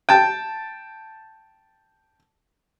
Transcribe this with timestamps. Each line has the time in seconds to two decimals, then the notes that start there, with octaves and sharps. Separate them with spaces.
0.09 G5 A5